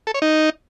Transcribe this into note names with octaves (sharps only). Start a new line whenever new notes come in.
A4
C#5
D#4